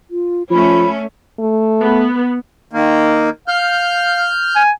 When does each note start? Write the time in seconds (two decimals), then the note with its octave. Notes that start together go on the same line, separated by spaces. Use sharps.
0.11 F4
0.51 F3 A3 C#4 B5
1.39 A3
1.82 B3
2.73 D#3 A#3
3.48 F5 F6 G6
4.56 G#5